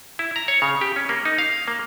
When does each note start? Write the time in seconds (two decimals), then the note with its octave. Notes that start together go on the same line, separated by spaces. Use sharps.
0.19 E4
0.36 A#5
0.48 C#5
0.62 C#3
0.81 G4
0.96 C#4
1.09 A#3
1.25 D#4
1.38 F5
1.68 A#3